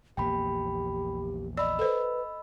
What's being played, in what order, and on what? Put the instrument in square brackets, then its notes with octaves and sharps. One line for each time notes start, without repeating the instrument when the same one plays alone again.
[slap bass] A#1 E2 A#3 [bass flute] G4 [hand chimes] G5 B5
[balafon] D5 [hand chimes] D#5 B5 E6
[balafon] A4 C5 [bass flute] B4